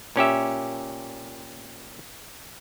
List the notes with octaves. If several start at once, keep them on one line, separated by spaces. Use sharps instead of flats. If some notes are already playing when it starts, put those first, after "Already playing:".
A#2 C#4 G4 E5